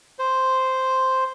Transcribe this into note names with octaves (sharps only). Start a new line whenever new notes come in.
C5